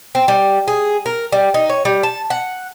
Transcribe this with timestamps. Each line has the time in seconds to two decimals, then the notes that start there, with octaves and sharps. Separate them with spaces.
0.15 C4
0.28 G3
0.68 G#4
1.06 A#4
1.32 G3
1.54 D#4
1.70 C#5
1.85 G3
2.03 A5
2.30 F#5